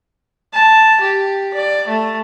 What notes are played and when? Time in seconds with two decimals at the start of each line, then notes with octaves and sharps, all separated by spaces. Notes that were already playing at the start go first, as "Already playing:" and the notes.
0.54 A5
1.01 G4
1.54 D5
1.88 A3